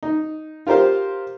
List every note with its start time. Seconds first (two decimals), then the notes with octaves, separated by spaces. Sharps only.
0.03 D#4
0.67 F4 G4 A#4 C5 F5